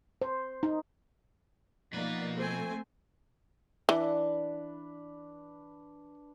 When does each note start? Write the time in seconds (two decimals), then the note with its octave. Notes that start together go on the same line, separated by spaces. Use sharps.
0.22 C5
0.63 D#4
1.93 B2 F3 A#3 D#4 B4 D5
2.36 A3 C4 C5 G#5
3.89 E3 D4 B4